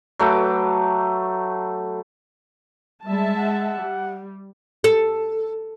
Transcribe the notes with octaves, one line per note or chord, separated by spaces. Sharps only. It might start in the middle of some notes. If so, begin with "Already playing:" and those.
F#3 A3 B4 D6
G3 G#3 E5 A5
F#5
G3
A4